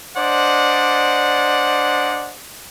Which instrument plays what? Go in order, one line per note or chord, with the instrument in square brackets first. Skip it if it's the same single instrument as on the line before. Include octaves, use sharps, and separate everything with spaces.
[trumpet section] D4 C5 D5 D#5 F#5